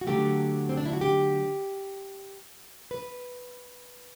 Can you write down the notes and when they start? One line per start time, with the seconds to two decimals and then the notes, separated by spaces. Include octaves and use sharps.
0.01 F#4
0.07 D3 F#3 A3 G4
0.69 C4
0.77 D4
0.86 E4
0.93 F#4
1.01 G4
2.91 B4